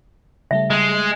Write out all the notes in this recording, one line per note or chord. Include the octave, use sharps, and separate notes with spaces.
C#3 G3 A3 E5
G#3
F#6